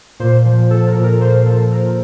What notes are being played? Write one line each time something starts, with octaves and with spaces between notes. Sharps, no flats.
A#2 C5
F3
F3 A4
A#4
A#2
A#4
A#2 C5
F3 A4
A#2 A#4